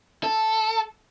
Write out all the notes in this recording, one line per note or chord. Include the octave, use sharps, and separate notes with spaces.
A4